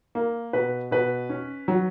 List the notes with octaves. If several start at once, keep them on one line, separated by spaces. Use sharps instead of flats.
A#3
B2 B4
B2 B4
C#4
F#3